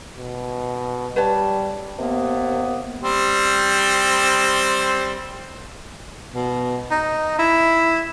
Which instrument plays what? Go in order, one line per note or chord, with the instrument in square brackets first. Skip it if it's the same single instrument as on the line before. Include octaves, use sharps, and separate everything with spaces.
[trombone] B2
[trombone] G3 [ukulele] B4 C#5 A5
[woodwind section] D#2 C3 A#3 B3
[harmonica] G3 C4 C5
[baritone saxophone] B2
D#4
E4